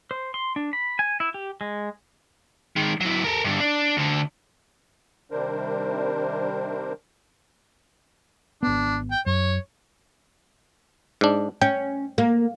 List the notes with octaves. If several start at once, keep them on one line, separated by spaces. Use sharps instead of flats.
C5
C6
D4
B5
G#5
E4
G4
G#3
D#3 G#3
F#3 E4
A4 A#4
G2 D3
D4
D2 D3
C3 D#3 G3 D4 A#4 C5
G#1 B3 D4
G5
F#2 C#5
G#2 D4
C#4 G5
A#3